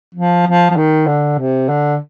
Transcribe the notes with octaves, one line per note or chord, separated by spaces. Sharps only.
F3
F3
F3
D#3
D3
C3
D3